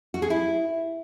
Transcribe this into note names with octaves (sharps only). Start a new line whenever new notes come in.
F#4
G#4
E4